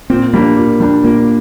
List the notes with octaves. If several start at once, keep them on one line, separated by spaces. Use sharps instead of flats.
A#2 C4
G3 A#3 D4
A#2
G3 D4
A#2 A#3